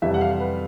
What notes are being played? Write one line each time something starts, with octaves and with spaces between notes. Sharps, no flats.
F2 C3 E3 G3 E5
F#5
F5
B4